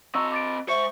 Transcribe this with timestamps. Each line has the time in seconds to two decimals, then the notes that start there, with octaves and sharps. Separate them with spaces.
0.15 C4 D#5 A#5 C#6 E6
0.32 D6 A6 D7
0.68 G#3 C5 E5 C#6 C#7